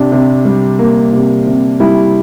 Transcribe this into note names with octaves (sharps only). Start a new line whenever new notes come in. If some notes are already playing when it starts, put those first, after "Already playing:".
Already playing: C3 D4
C3
G3
A#3
C3
C3
G3 E4